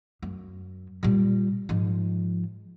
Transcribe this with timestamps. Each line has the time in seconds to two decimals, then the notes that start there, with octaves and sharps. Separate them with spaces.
0.22 F#2
1.03 A#2 G3
1.69 G#2 F3